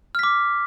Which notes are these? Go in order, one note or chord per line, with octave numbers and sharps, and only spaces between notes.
D6 F6 B6